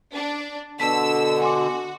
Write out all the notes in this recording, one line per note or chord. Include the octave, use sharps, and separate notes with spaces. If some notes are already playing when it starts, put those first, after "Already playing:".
D4
B2 D3 A5 E6 B6
F#4 G#5 C6 D6